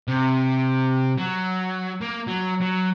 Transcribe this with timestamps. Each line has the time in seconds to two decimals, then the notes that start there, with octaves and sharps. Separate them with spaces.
0.08 C3
1.18 F#3
2.02 A#3
2.28 F#3
2.61 F#3